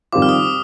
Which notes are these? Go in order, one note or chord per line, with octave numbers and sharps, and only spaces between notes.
F2 D#3 G3 C4 F4 D6
F6
D#6